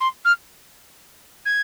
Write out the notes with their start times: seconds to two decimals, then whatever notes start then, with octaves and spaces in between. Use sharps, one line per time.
0.01 C6
0.25 F6
1.46 G#6